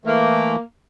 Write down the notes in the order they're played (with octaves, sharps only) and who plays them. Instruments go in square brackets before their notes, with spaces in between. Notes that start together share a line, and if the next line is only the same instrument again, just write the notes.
[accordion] E3 A3 [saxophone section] A#3